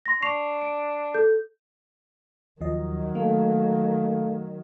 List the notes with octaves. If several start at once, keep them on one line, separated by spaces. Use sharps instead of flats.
C6 A#6
D4 C#6 C7 F7
D7
A4 G6
D#2 D#3 F3 F#3 D#5
A3 A#3 A4 F5